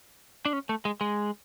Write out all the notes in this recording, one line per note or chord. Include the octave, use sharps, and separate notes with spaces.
D4
C#4
A3
G#3
G#3